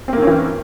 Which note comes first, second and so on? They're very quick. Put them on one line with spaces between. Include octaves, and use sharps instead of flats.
C4 A#3 D#3 C#4 E3